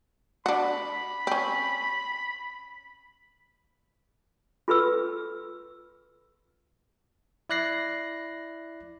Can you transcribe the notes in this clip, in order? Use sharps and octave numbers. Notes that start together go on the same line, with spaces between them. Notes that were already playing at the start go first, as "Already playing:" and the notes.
D4 F#4 B5
C4 C#4
F4 A4 B4 E6
E4 D5 F#6 A#6 C7